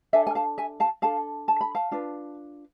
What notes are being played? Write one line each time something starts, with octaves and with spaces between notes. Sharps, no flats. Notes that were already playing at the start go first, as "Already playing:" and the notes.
D4 A4 E5 G#5
G#5
F5 A5
E5 G#5
F5 A5
D4 A4 F5 A5
A5
B5
F5 A5
D4 F4 B4